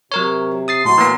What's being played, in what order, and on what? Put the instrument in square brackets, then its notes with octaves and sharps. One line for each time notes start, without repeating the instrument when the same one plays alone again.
[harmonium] C3 [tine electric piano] F#3 A#4 C#5
[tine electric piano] D#6 A6 C7
[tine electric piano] A2 [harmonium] F#3 F#4 [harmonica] C6
[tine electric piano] E3 A#3 B3